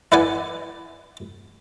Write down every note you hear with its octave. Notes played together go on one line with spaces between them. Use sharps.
E4 B4 D5 F#5 G#5